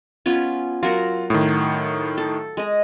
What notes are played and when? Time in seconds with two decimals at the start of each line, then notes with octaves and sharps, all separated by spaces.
0.26 B3 C#4 F4
0.83 F#3 F4 A#4 F#5
1.30 A2 D#3
2.18 A4
2.57 G#3 D#5